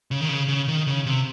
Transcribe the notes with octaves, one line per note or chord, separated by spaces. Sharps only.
C#3
D#3
C#3
C#3
D#3
C#3
C3